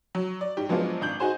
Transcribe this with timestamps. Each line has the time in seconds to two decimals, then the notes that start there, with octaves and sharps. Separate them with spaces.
0.15 F#3
0.41 D5
0.57 G#2 G4
0.69 F3 F#3 G#3 B3 D4 F4
1.01 G#1 D4 G6 F#7
1.20 D#4 F#4 G#4 C5 G#5